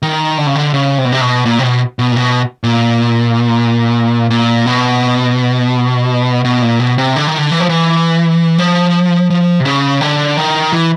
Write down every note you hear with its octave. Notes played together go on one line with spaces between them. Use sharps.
D#3
D3
C#3
D3
C#3
C3
B2
C3
B2
A#2
C3
B2
B2
A#2
B2
A#2
A#2
B2
B2
A#2
B2
C3
D3
D#3
D3
E3
F3
E3
F3
F3
C3
C#3
D3
D#3
E3